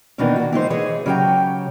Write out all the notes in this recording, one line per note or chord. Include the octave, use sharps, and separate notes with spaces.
D#2 B2 D#3 E3 D4 D#4
F#4
E3 G#3 D#4 C5
E3 G#4 C#5 D#5
C#3 F#3 G4 G5 A#5